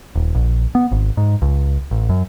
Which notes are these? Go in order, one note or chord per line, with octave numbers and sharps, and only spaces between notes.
D#1
A#1
B3
G#1
G#2
C#2
A1
F#2